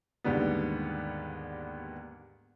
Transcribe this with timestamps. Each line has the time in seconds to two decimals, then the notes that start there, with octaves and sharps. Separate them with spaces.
0.24 D#2 G#2 D3 G3 B3